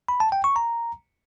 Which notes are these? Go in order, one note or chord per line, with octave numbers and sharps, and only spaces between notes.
B5
A5
G5
C#6
A#5